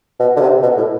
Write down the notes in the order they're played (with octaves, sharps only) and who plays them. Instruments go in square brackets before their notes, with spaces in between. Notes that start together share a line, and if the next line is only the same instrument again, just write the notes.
[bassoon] B2
D3
C3
B2
A2